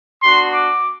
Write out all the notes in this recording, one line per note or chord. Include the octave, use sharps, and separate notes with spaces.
B3 D4 F#4 C6
D6